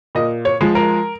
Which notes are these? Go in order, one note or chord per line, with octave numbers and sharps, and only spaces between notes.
A#2 D#5
C#5
F3 G#3
A#4